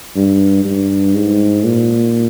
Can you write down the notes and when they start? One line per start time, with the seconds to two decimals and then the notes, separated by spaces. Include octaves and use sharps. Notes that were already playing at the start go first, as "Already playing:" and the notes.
0.16 G2
0.65 G2
1.15 G#2
1.65 A#2